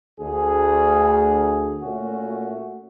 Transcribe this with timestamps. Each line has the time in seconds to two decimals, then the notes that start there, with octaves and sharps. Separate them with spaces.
0.20 D2 G#4
1.82 A#2 A3 C#4 F#4